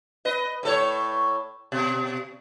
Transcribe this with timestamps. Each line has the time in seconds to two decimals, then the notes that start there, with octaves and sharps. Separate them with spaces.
0.25 B4 D#5
0.63 A2 A4 C#5
1.72 B2